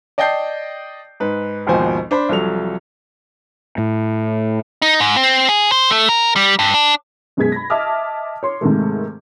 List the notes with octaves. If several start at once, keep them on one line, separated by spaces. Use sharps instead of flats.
D5 D#5 G5 A5 G6 C7
G#2 B4
G#1 D#2 B2 F3 C5 G#5
D4 C5 B5
C2 F3 F#3 A4 F7
A2
D#4
G#2
C4
G#4
C5
A3
A#4
G3
G2
D4
F#2 B2 G#3 G#4 G#6 B6
B5 A#6
D#5 E5 A5 D6 D#6 F6
C#5 C6
G#2 C3 D#3 A3